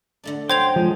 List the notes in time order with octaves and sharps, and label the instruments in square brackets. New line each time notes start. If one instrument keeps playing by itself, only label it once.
[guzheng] D3 A3 D4
[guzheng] F#2 F#3 [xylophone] C5 G#6 F7 [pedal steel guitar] G5 C6
[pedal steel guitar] F3 G#3